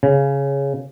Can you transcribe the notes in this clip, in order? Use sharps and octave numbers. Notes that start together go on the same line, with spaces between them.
C#3